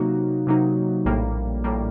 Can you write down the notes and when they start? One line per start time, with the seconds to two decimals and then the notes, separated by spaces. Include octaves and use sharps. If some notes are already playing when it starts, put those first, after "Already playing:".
Already playing: C3 F#3 A#3 D#4 F#4
0.47 C3 F#3 A#3 D#4 F#4
1.05 A#1 A2 G3 A#3
1.64 A2 G3 A#3